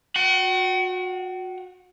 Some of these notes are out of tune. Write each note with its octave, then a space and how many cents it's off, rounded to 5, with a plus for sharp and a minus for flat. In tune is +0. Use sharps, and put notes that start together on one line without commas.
F#4 -30 F#5 +45